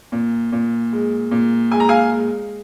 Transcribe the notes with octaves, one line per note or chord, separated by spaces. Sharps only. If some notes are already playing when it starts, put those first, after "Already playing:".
A#2
A#2
G#3
A#2
G#3 G#5
A#5
F5 G#5
G#3